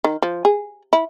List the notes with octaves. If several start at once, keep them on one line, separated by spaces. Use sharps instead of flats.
D#3
F3
G#4
E4